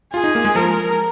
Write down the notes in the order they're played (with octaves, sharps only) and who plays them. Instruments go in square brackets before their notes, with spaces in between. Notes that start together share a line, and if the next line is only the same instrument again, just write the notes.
[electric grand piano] F4 [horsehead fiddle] G#4
[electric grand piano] D#4
A#3
G#3
[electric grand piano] F3 [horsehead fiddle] A#4